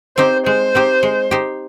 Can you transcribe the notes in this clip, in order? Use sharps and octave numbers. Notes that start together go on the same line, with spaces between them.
C4 D#4 G4 C5
G#3 C5
C4 D#4 G4
G#3
D#4 G4 C5